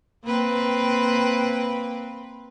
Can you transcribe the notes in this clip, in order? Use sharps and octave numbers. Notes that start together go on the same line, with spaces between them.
A#3 C4 B4